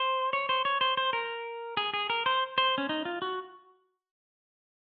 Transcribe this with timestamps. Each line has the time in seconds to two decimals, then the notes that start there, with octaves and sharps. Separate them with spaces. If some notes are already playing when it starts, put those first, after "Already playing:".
Already playing: C5
0.33 C#5
0.49 C5
0.65 C#5
0.81 C5
0.97 C5
1.13 A#4
1.77 G#4
1.94 G#4
2.10 A#4
2.26 C5
2.58 C5
2.78 C#4
2.89 D#4
3.05 F4
3.22 F#4